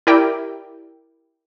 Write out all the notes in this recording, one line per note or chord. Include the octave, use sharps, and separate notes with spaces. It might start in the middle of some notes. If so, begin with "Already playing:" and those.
E4 G4 A#4 D5 G5